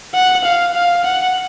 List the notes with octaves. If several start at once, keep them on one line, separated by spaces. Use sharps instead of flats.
F#5
F5
F5
F#5